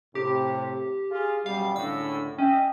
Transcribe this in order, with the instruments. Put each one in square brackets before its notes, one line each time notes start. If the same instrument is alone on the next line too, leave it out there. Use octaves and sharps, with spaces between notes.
[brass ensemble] A2 C3 [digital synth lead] G4
[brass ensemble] F4 G#4
[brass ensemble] F#2 B2 G3 [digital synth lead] F5
[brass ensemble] C#2 A2 D3 [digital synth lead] E6
[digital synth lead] C#4 [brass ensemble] D#5 E5 G5